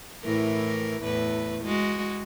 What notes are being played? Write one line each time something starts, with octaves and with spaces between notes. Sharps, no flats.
A2 E3 A#4
E2 A2 B4
G#3 F#4